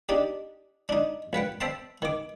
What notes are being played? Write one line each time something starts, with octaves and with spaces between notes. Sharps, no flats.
D4 D#4 G4
D4 D#4
A#1 B4 F#5 G5
C5 E5 G5 A5 C6
D#3 D6